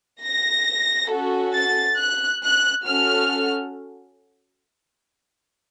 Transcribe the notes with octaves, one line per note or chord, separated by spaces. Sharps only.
A#6
C#4 F#4 A4
A6
F#6
F#6
C#4 F#4 A4 F6